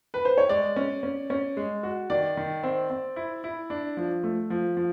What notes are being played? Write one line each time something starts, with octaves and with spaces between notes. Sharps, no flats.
B4
C5
C#5
G#3 D5
C#4
C#4
C#4
G#3
F#4
D#3 D5
D#3
C4
C4
E4
E4
D4
F3
A3
F3
F3